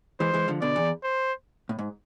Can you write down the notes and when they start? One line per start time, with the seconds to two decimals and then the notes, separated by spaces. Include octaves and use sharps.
0.20 E3 G#3 C5
0.34 E3 G#3
0.48 D3 F3
0.62 B2 D3 D5
0.76 E2
1.04 C5
1.69 A2
1.79 G#2